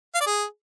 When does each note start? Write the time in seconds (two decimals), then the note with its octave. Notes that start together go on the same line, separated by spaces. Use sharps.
0.15 F5
0.21 D5
0.27 G#4